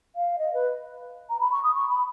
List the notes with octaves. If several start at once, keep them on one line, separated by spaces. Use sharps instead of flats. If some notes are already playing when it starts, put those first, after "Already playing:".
F5
D#5
B4
A#5
B5
C#6
D#6
C#6
B5